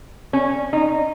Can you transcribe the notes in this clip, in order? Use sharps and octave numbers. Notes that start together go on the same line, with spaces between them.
C#4
D#4